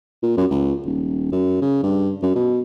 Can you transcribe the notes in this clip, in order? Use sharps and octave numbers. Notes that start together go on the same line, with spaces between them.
A#2
F#2
C#2
D#1
F#2
C#3
G2
F#2
B2